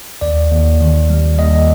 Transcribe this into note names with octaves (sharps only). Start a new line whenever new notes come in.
D#2 D5
D#2
D#3
G3
D#2 D#5